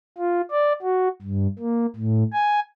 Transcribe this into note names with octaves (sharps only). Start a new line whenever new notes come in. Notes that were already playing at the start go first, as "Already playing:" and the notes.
F4
D5
F#4
G2
A#3
A2
G#5